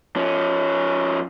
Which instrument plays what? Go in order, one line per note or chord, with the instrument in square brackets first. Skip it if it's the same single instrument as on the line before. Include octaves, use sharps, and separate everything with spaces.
[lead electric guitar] F3 C#4